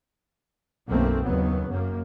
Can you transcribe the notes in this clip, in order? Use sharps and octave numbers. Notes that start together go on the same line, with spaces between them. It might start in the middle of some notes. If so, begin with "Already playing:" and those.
B1 F#2 A3 A#3 C4
F#1 D#2 F#3 B3
F#2 A#3